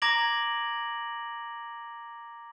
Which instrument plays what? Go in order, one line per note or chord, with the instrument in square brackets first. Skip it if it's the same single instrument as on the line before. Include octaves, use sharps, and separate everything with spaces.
[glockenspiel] A#5 D6 G#6 A#6 D7 F#7